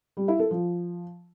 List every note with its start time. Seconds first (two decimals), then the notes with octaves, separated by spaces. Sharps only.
0.17 G3
0.28 E4
0.39 A4
0.51 F3